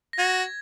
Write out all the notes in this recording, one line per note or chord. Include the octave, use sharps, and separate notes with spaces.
A#6
F#4 G#6